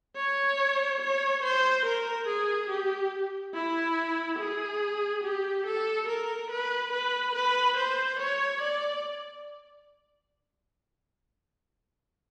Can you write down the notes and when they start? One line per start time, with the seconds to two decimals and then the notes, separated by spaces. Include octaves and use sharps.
0.16 C#5
1.01 C#5
1.43 C5
1.85 A#4
2.28 G#4
2.70 G4
3.54 E4
4.39 G#4
5.24 G4
5.66 A4
6.08 A#4
6.51 B4
6.93 B4
7.35 B4
7.77 C5
8.20 C#5
8.62 D5